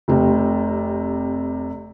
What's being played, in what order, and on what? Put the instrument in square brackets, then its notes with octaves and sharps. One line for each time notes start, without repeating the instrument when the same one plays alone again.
[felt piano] F1 C3